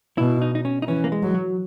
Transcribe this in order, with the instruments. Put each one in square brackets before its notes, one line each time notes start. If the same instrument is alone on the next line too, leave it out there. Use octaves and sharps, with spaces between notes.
[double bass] B2 [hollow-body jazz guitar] E4
[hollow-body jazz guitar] D#4
D#4
C#4
D#4
[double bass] E3 [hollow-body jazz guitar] C#4
[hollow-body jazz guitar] A#3
G#3
[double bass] F#3
[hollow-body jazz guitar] F#3